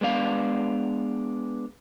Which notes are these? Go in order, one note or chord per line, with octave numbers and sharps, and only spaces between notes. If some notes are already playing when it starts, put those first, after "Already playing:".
G#3 B3 D4 F5